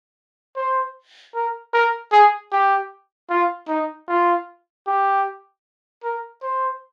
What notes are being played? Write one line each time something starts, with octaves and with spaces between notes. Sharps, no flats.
C5
A#4
A#4
G#4
G4
F4
D#4
F4
G4
A#4
C5